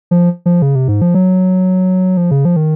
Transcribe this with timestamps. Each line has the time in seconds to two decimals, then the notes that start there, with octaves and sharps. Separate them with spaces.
0.11 F3
0.46 F3
0.62 C#3
0.75 C3
0.88 G#2
1.02 F3
1.14 F#3
2.17 F3
2.31 C#3
2.45 F3
2.56 D#3